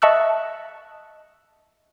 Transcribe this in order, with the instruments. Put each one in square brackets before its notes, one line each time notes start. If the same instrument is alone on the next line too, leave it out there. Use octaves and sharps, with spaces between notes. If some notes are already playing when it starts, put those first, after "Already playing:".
[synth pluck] D#5 E5 A5 C#6 E6 F#6